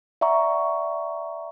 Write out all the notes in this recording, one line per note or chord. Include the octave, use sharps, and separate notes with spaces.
D5 E5 F#5 A#5 C#6